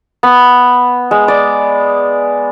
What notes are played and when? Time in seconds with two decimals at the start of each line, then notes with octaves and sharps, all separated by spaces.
0.23 B3
1.11 G#3
1.28 D5